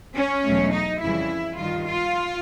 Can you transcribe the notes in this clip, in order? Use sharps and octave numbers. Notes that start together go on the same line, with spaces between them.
C#4
E2 B2 F#3 A3
D#4
F2 C#3 E3 G3 E4
G2 D#3 G3 F4
F4